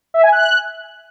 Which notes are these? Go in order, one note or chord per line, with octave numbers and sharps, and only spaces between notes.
E5
G#5
F#6